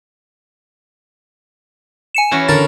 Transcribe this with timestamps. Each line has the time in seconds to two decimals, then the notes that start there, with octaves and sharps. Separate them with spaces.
2.15 G#5 C#7 E7
2.31 E3 C#4 F#4
2.49 D3 A#4 A6